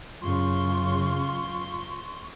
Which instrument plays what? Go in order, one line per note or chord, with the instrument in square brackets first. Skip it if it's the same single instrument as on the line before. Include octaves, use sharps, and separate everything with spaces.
[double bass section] F#2 C#3 [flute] F4 [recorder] C6 [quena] C#6